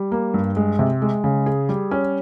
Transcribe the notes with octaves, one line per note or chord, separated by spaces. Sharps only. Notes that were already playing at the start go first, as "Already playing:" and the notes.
Already playing: G3
A#3
G2
G#3
C3
G#3
C#3
G#4
G3
C#4